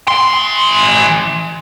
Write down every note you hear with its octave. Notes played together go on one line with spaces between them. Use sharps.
E3 C6